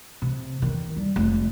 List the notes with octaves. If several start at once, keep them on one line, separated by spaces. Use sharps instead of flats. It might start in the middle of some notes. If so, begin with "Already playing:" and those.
C3
E2 D#3
G3
F1 G#3